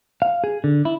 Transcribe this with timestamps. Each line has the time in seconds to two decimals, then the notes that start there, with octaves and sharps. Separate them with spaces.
0.22 F5
0.44 G#4
0.64 D3
0.85 E4